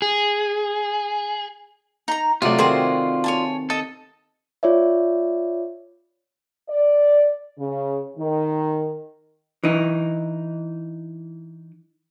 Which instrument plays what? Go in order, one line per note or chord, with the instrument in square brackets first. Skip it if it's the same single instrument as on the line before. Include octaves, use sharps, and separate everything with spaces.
[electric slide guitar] G#4
[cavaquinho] D#4 A#5
[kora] C3 F#3 A3 [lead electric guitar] F4 D5 [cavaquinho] D#5
[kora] D#3 C4 F#4 [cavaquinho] G#4 C5 D#5
[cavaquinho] C#5 G#5 A5
[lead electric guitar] A4 [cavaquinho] D#5
[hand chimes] F4 C#5 D5 E5
[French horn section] D5
C#3
D#3
[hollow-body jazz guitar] E3 D#4